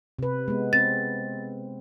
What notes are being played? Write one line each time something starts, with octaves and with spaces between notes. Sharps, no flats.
C3 B4
G#3 B3
C4 A6